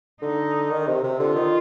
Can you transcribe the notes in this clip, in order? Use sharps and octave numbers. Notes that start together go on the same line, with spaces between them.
D3 D#4
D#3
C3
C3
D3 F4
D#3